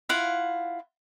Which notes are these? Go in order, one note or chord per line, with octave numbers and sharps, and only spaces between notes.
E4 F4 F5 F#5